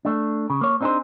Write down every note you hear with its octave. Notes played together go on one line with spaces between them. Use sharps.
A3 D4
C#3
A#3 C#5
C4 D4 D#4 G4 G#4 C5